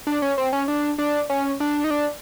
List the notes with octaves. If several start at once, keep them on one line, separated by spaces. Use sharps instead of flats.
D4
C#4
C4
C#4
D4
D4
C#4
D4
D#4
D4